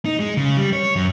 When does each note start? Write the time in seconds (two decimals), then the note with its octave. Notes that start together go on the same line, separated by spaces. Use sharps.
0.05 D#4
0.20 G#3
0.37 C#3
0.57 G3
0.73 C#5
0.96 F#2